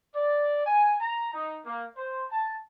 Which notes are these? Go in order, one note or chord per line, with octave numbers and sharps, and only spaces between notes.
D5
G#5
A#5
D#4
A#3
C5
A5